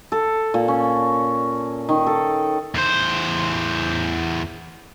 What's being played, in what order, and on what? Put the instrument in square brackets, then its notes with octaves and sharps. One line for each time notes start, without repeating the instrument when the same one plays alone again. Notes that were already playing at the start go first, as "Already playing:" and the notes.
[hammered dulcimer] A4
A#2
C#4
D#3
A4
[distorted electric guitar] E2 C5